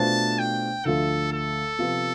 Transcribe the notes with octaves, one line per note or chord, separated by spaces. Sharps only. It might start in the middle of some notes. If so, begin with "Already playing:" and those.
Already playing: B2 A3 D4 F4 C5 A5
G5
D2 D3 F3 A3 A4
A4
C3 F3 B3